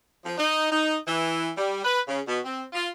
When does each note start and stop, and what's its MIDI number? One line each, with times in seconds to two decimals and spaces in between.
0.25 0.35 53
0.38 0.69 63
0.72 0.97 63
1.07 1.50 52
1.57 1.81 55
1.85 2.00 71
2.08 2.20 49
2.28 2.40 47
2.45 2.63 60
2.73 2.89 65